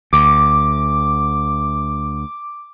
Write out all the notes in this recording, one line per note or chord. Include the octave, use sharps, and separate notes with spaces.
D2 D6